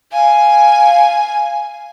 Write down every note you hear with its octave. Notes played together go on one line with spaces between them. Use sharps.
F5 G#5